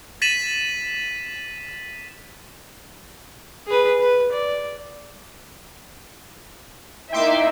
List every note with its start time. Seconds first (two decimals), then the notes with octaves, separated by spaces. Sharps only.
0.22 A6 B6 D#7 E7 F#7
3.67 G#4 B4
4.00 B4
4.32 D5
7.13 A#3 D#4 E4 E5 G5 C6 D6